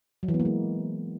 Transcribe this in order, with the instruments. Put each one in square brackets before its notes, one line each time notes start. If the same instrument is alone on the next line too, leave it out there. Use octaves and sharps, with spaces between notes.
[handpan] F#3
E3
B3
A#3
G#3